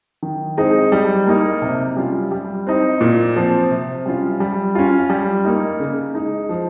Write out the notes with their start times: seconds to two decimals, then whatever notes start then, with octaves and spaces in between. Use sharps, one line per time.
0.23 D#3
0.57 G#3 C4 D#4
0.92 G3
1.27 A#3 D#4
1.62 C3
1.96 G3 C#4 F4
2.31 G3
2.67 C4 D#4
3.01 A#2
3.36 F3 C4
3.70 C3
4.06 G3 C#4 F4
4.40 G3
4.75 C#4 F4
5.09 G3
5.45 A#3 D#4
5.80 C#3
6.14 G#3 D#4
6.49 F3